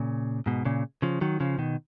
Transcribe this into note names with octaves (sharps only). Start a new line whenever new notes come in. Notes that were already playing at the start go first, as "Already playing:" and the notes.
Already playing: A#2 C#3
G#2 B2
A#2 C#3
C#3 F3
D#3 F#3
C#3 F3
B2 D#3